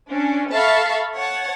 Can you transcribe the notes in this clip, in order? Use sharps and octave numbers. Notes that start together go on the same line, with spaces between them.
C#4 D4
A4 E5 F5 A5 B5 C#6
C#5 F#5 A5